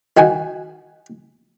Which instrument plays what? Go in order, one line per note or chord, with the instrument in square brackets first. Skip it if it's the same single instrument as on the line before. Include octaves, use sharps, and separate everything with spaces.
[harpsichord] D#3 F#4 G#5